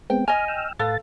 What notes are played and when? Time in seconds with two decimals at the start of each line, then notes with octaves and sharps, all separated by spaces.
0.10 G#3 B3 C4 G5
0.28 D#5 G#5 F6
0.48 G5 E6 F6
0.79 A2 A4 B4 F5 A6